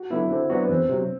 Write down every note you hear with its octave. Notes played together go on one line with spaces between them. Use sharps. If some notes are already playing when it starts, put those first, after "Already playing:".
Already playing: F#4
D3 F#3 B3 E4
D3 C4
F#3 B3 D4 F#4
B3
E2 C4
C3 F#3